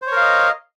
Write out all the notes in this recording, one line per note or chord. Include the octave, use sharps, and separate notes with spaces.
A#4 C5 C#5 D#5 F5